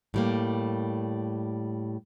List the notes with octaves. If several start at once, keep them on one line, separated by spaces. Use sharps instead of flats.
A2 G3 A#3